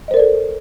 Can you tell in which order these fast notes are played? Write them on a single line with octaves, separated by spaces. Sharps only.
D#5 C5 A#4 D5 A4